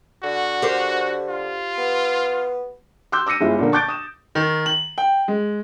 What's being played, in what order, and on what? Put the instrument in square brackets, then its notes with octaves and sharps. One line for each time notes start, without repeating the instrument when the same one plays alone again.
[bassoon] D3 [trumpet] F#4
[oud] G4 A#4 C5
[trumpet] F4
[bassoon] B3
[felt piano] C6 D6 E6 G6
D6 E6 A#6 C#7 D#7
G1 G#3 E4 F4
A#2 D3 A#3
A5 C#6 D6 G6 A6 D7
D#6 E7
[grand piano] D#3
F#7
G5
G#3